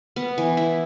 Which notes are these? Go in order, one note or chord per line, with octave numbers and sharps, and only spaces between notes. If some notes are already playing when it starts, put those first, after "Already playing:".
B3
E3
E4